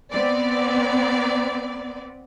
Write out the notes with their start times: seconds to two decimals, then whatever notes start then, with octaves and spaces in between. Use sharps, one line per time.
0.11 B3 C4 D5